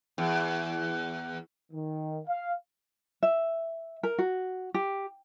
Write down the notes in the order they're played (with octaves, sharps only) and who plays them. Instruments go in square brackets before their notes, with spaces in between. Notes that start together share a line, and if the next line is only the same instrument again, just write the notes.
[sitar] E2
[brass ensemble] D#3
F5
[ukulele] E5
A#4
F#4
G4